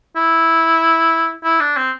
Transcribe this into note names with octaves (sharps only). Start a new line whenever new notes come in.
E4
E4
D4
C4